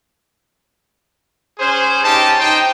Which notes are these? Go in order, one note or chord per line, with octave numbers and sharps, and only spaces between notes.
C#4 G#4 C5
C#4 D#4 G4 A5
D#4 C5 G5